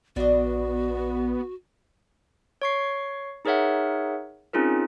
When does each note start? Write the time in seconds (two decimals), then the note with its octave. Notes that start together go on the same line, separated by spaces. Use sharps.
0.16 A#1 B3 D4 F#4 D5 D#5
2.62 C#5 C#6 C7
3.45 D#4 G#4 A#4 C#5 E5 F#5
4.54 C4 C#4 D#4 F4 G#4 A#4